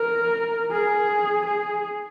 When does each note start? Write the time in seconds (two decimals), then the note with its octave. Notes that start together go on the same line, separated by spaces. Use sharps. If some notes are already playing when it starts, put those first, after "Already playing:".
Already playing: A#4
0.71 G#4
1.46 G#4